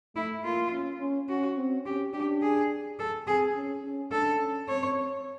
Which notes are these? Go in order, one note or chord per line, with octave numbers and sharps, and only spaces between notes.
A3 E4
A#3 F4
C#4
C#4
C#4 F#4
C4
C#4 G4
D4 G4
G#4
A4
C4 G#4
C#4
C#4
D4 A4
C#4
C4 C#5